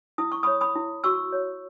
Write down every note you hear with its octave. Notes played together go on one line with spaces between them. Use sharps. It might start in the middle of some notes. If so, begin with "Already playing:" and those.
E4 D#6
C#6
C#5 B5 D#6
B5 D#6
E4
F#4 C#6 E6
C#5